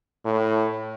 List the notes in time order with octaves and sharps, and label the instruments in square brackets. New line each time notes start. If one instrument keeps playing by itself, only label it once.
[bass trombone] A2